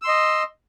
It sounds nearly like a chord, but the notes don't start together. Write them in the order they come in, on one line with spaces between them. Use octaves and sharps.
E6 C6 D#5